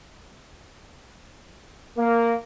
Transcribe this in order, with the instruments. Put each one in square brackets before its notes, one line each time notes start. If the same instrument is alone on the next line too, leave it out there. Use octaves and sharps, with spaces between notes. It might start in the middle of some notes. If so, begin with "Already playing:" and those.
[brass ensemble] A#3